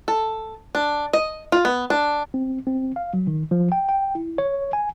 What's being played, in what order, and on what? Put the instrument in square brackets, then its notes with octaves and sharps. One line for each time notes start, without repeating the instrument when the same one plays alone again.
[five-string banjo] A4
D4
D#5
F4
B3
D4
[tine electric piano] C4
C4
F5
F#3
D#3
F3
G5
G5
E4
C#5
G#5